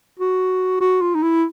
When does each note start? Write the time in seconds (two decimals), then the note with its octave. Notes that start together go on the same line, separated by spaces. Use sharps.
0.19 F#4
0.80 F#4
1.01 F4
1.15 D#4
1.23 E4